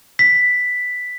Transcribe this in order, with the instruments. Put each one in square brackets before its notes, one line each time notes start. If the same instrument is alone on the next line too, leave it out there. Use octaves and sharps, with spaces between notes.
[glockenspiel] B6